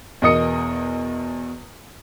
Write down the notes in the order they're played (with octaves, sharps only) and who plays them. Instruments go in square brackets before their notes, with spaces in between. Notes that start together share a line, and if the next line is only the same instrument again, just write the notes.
[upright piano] E2 B2 A#4 D#5 D#6 C#7